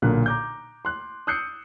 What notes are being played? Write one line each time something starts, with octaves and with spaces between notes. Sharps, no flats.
B1 A#2 D3 A#3 F#6
A#5 D6 G6
C6 F#6
D#6 E6 F#6 G6 C7 C#7